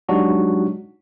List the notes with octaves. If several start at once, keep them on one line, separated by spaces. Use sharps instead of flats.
F#3 G#3 D4 D#4 F#4 G4